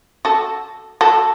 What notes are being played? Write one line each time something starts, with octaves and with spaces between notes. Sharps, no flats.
F#4 A4
F#4 A4